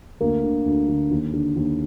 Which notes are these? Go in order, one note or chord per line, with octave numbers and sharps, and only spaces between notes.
D2 A#3 A#4
D3
D2
D3
D#2
D3
D#2